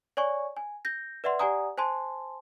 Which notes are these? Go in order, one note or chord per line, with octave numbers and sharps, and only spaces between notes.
C#5 D5 G#5 C#6
G#5
G6 A#6
B4 D5 E5 F#5 C6
G4 D5 F#5 G#5 A#5 D#6
C5 G#5 A5 C6